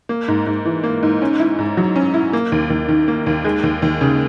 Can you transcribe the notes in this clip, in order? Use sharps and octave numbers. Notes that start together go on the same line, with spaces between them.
A#3
G#2
G#2
E3
A#3
G#2
C#4
E4
G#2
F#3
C#4
E4
A#3
D#2
D#2
D#3
A#3
D#2
G#3
D#2
D#2
C#3